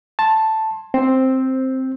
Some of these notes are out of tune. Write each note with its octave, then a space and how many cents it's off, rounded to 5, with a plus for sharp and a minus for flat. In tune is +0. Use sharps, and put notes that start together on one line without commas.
A5 +0 C6 +20
C4 +0 C5 +10